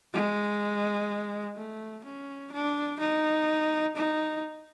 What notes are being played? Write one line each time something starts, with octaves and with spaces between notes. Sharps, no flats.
G#3
A3
C#4
D4
D#4
D#4